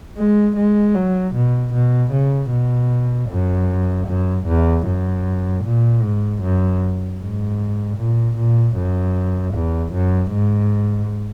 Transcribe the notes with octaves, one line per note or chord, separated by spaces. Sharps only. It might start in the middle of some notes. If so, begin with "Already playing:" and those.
G#3
G#3
F#3
B2
B2
C#3
B2
F#2
F#2
E2
F#2
A#2
G#2
F#2
G#2
A#2
A#2
F#2
E2
F#2
G#2